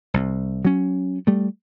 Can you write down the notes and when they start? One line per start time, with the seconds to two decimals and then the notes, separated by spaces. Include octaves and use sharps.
0.14 C2
0.65 F#3 C#4
1.27 G3 A3